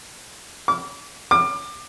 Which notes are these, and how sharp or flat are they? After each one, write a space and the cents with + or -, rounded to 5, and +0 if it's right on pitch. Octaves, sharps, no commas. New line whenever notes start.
D6 -30
D6 +25